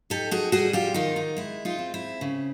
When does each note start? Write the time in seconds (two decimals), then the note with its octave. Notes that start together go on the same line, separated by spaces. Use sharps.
0.10 D#4 G4 A4
0.31 F#4 G#4
0.52 G3 F#4 G#4
0.73 F4 G4
0.94 D#3 D#4 F4
1.16 D#4
1.37 G#3 E4
1.65 D#4 F4
1.79 C4
1.94 E4
2.21 C#3